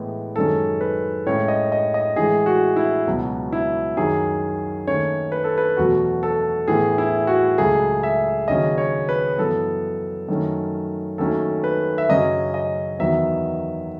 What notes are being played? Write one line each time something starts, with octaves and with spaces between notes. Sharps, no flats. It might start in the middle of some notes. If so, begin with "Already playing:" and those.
Already playing: A2 E3 G#3 B3
F#2 D#3 G#3 C#4 A4
B4
A2 G#3 C#4 C#5
D#5
D#5
D#5
A2 E3 G#3 G#4
F#4
E4
C#2 B2 F#3 B3
E4
F#2 D#3 F#3 G#4
D#2 D#3 A3 C#4 C#5
B4
A4
B4
E2 B2 F#3 A3 F#4
A4
A2 E3 B3 G#4
E4
F#4
C#2 C#3 F#3 A3 G#4
E5
D#2 C#3 F#3 C#4 D#5
C#5
B4
F#2 E3 B3 A4
F#2 D#3 A3 C#4
D#2 D#3 F#3 A3 C#4 A4
B4
E5
F#2 C#3 F#3 C#4 D#5
D#5
E2 D#3 F#3 B3 E5